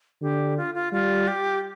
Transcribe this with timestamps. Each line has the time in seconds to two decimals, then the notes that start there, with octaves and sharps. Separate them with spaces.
0.22 D3 G4
0.57 F4
0.75 F4
0.92 G3 F4
1.28 G4